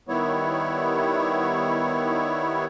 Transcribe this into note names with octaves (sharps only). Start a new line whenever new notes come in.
D#3 G3 B3 E4 C#5